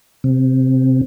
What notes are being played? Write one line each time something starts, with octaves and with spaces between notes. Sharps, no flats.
C3